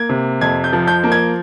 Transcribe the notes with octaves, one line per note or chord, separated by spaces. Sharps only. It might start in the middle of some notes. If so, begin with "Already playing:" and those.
Already playing: A#3 G#6
C3
F2 G#6
G6
F3
G6
A#3
G#6